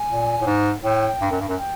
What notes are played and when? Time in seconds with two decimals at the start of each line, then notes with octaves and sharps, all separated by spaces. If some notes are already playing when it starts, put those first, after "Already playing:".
Already playing: G#5
0.10 A#2
0.41 A2
0.46 G#2
0.84 A2 G5
1.21 G2
1.31 F#2
1.40 G2
1.49 F#2
1.58 G5